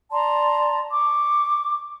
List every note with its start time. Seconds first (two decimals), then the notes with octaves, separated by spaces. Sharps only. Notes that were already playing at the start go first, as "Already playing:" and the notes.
0.12 D5 A5 A#5 C6
0.91 C#6 D6